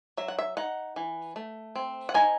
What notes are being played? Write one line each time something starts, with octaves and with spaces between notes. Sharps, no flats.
F#3 E5
F#5
E5
D#4 F#5
E3
A3
C4
F#5
D#4 G#5